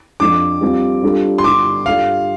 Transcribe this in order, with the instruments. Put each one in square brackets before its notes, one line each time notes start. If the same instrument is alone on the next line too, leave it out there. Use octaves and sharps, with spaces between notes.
[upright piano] F2 F3 D4 [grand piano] D6
[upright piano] G3 C4 F4
G3 D4 F4 A4
[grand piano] C6
[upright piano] G2 D3 G3 [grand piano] D6
[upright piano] G2 G3 F4 A4 D5 [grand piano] F5